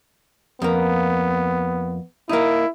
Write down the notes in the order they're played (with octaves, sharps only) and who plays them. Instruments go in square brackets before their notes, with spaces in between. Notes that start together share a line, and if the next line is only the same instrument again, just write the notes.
[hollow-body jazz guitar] F2 A#3 [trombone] B3
[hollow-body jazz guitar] A#3 D#4 [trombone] E4